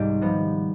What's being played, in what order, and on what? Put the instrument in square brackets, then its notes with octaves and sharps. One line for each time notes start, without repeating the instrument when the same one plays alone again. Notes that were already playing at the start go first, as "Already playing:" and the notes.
Already playing: [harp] C2 G#2 D#3 G3 C4 G4
C3 F3 B3